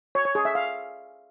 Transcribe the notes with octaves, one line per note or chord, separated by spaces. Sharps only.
C#5
C#5
G#4
E5
F5